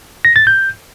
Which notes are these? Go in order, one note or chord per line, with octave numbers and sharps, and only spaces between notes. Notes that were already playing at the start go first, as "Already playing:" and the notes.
A#6
A6
G6